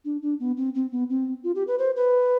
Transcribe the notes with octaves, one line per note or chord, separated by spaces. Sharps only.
D4
D4
B3
C4
C4
B3
C4
F4
G4
B4
C5
B4